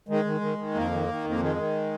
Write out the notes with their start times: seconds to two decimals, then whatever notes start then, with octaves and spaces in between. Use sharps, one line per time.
0.09 D#3 G#3
0.25 D#3
0.41 D#3
0.58 D#3
0.74 F2 A#3
0.91 D#3
1.08 D#3
1.24 F2
1.30 A#3
1.40 D#3 G#3
1.57 D#3